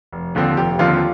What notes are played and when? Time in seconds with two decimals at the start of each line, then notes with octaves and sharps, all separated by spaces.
0.13 F1
0.35 D#2 D3 F3 C4
0.57 F1 G4
0.79 D#2 D3 F3 C4 F4